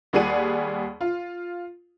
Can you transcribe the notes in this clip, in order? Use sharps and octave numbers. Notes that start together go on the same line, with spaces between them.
D#2 G3 G#4 D5 F#5 D#7
F4